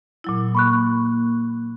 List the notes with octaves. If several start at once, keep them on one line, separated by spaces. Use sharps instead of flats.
A#2 F#3 E4
A#3 B5 C#6 F#6